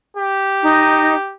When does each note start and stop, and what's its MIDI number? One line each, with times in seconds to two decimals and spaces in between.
0.17 1.35 67
0.62 1.14 63